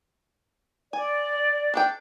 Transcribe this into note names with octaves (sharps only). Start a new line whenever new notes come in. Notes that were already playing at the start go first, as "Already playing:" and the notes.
D5 G#5
D4 A4 G5